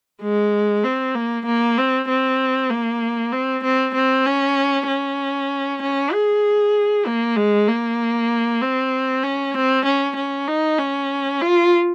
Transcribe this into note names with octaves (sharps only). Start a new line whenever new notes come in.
G#3
C4
A#3
A#3
C4
C4
A#3
C4
C4
C4
C#4
C#4
C#4
G#4
A#3
G#3
A#3
C4
C#4
C4
C#4
C#4
D#4
C#4
F4